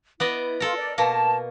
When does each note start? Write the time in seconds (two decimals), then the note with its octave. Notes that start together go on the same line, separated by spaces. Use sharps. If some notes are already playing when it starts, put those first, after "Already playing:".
0.20 B3 E4 D5 D#5
0.60 F4 A4 A#4
0.76 D5
0.98 B2 A#3 A5